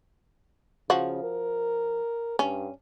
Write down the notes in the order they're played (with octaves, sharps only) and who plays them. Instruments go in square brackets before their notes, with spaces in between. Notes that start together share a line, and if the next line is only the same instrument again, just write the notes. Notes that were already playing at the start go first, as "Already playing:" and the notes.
[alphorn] C#3 [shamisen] F3 F#4
[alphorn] A#4
[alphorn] G2 [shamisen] C#4